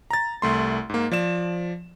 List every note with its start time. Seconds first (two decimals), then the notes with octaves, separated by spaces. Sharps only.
0.11 A#5 A6
0.42 C2 A3 C6
0.90 G#2 A#3
1.11 F3 D5 E7